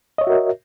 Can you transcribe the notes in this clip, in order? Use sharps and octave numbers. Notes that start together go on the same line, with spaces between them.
F#4 A#4 C#5 D#5 E5